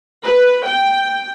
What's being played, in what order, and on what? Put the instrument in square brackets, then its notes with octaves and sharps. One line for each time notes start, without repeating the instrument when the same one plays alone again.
[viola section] B4
G5